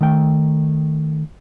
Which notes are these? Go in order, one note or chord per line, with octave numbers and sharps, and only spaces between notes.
D#3 A3 G5